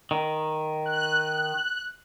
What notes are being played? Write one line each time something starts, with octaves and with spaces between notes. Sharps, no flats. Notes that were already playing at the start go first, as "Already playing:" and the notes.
D#3
F#6